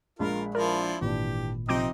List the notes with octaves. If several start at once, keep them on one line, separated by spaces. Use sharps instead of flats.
A#1 G#3 F4 A#4 B5
F3 E4 A#4 D5
G#1 A#2 E3 D4 G4
C3 F3 C4 D#4 D#5 D6 G6 D7